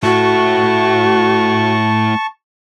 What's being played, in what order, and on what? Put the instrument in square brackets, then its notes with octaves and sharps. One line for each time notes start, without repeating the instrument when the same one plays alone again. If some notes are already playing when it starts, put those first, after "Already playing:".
[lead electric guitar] A3 E4 [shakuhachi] F#4 [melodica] A5 C#6